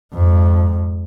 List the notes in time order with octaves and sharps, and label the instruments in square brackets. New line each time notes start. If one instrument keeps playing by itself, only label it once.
[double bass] F2 G#2